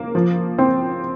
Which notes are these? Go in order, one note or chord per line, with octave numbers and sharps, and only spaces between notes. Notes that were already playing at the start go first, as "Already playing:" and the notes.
Already playing: A#3
F3
C4